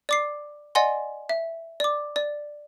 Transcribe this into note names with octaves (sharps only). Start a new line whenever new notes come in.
D5 D6 C7
D5 D#5 F#5 G#5 C6
E5
D5 D6
D5